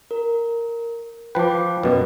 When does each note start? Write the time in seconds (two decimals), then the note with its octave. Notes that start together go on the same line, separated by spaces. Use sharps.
0.11 A#4
1.35 F3 B4 G5 D6
1.83 F#2 B2 B4